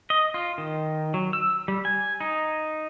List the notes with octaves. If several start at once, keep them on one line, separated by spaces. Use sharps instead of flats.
D#5
F4
D#3
F#3
E6
G3
G#5
D#4